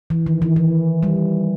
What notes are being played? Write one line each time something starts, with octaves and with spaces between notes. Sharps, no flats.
E3
D#3
E3
E3
G3